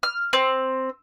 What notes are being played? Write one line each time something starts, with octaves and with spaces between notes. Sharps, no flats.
F6
C4